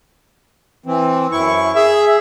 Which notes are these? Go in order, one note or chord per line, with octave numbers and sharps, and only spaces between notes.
E3 C4
F#2 E4 C#6
G#4 E5